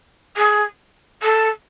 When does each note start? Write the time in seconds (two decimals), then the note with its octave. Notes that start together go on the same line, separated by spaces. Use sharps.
0.36 G#4
1.22 A4